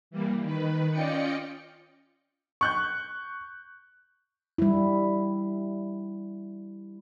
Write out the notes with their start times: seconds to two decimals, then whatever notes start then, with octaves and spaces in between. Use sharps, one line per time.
0.11 E3 G3 A#3
0.42 D#3 B4
0.91 C#4 F4 D5 D#5 G5 C#7
2.61 C#6 F#6 G6
4.58 G3 E4